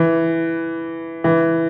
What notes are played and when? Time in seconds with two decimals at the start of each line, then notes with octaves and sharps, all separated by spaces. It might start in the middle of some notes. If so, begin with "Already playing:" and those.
Already playing: E3
1.24 E3